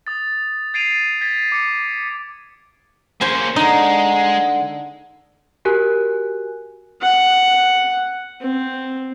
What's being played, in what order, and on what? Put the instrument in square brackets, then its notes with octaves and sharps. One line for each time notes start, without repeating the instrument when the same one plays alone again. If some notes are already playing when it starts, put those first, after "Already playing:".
[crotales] D#6 A6
G#6 A6 C7 D7 D#7 F7
G#6 A6 B6
D6 C#7
[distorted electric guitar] A#3 C#4 [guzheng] C5 G#5
[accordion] D3 [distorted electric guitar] G#3 [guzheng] D#4
[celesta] F#4 G4 A#4 G#5 F#6
[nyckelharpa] F#5
C4